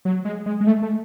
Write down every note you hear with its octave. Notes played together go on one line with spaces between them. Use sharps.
F#3
G#3
G#3
G#3
A3
A3